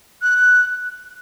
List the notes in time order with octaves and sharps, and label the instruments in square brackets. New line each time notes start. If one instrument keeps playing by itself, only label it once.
[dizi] F#6